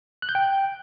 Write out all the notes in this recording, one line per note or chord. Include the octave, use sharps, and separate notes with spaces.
F#6
G6
G5